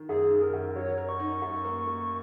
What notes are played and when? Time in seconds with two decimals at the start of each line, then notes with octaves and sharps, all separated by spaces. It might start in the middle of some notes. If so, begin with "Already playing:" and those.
Already playing: D#3
0.09 F#2 G#4
0.31 D#3
0.42 A#4
0.53 F#2
0.76 F#3 C#5
0.98 A#4
1.09 C#6
1.20 D#4
1.42 F#2
1.65 A#3
1.86 A#3